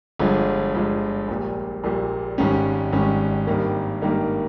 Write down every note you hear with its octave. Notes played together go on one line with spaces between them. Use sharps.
G1 G2 F3 G#3
G1 G2 F3 G#3
A#1 A#2 G3
A#1 A#2 G3
G#1 G#2 G3 C#4
G#1 G#2 G3 C#4
G#1 G2 D#3 G3 A#3
G#1 G2 D#3 G3 A#3